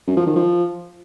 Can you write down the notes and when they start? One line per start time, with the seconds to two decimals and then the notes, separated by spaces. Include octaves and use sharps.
0.07 F#2
0.17 F3
0.26 D#3
0.36 F3